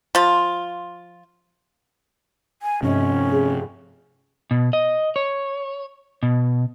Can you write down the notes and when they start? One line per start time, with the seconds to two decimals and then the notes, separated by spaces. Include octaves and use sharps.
0.15 F3 F4
2.62 G#5
2.83 G2 C3 F3 C#4 D#5
3.32 G#4
4.51 B2
4.73 D#5
5.16 C#5
6.23 B2